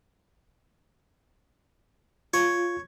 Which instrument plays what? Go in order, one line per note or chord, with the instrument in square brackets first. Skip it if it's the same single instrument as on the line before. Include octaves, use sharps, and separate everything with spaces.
[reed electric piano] F4 [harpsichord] C#5